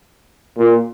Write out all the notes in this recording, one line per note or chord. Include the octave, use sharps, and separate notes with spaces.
A#2